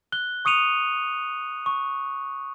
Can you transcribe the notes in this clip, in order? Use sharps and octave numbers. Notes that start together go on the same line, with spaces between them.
F#6 G7
C#6 D#6 C#7 D#7 F7
C#6